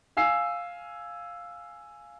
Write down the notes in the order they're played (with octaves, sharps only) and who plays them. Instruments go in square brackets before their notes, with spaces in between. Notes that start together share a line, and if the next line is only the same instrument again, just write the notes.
[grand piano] F5 G#5 E6 C7